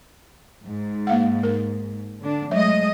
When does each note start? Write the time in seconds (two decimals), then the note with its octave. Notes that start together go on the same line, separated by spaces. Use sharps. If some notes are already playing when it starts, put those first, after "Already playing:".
0.63 G#2
1.07 A#3 F5 F#5
1.43 A#4
2.20 D3 D4
2.51 F#3 G#3 A3 D#5 E5